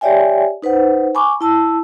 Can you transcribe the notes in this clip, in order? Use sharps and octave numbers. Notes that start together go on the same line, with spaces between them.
G4 C#5 D5 E5 G5 G#5
D#4 B4 C5 F#5
G#5 B5 C#6 D6
E4 A5 E6